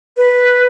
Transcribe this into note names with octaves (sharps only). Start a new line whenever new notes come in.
B4